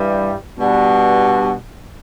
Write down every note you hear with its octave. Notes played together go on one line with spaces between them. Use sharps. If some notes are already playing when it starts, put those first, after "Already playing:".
Already playing: G2 E3 G3
B2 G3 B3 D4 F#4